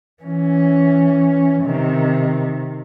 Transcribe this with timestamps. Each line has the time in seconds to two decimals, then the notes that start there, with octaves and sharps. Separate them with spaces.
0.23 E3 C#4
1.63 C3 D#3